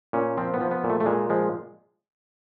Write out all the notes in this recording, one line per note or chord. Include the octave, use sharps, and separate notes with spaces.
A#2 C#4
F3 C4
B3
F3
B3
A#2
A3
A3
A#2 G#3
F3 G#3